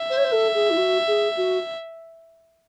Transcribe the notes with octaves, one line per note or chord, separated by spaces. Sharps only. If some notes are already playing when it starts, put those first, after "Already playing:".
Already playing: E5
C5
C#5
C5
A4
G#4
E4
F#4
G#4
F#4